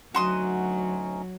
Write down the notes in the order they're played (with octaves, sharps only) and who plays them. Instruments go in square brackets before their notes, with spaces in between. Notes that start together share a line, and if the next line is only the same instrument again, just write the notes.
[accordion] D2 C#4 D#4 [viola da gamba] F#3 [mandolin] F#4 C6 D#6